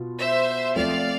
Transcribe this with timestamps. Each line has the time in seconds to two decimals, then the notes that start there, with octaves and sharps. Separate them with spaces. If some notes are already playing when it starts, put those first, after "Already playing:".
Already playing: B2 B3 F4
0.19 C5 E5
0.76 F3 A3 C4 F4 D5 F5